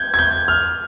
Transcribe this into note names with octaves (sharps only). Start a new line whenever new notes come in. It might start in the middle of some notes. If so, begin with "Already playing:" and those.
Already playing: G6 G#6
G#6
G6
F6